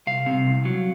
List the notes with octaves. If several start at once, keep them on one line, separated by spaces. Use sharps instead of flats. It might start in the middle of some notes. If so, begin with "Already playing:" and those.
C2 F5
C3
C2
F#3